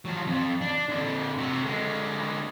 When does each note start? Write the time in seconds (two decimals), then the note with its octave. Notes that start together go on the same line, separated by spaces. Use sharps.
0.05 F3 F#3
0.27 F2
0.61 D4
0.89 F2 D3
1.38 C3 F#4
1.62 D3 G#3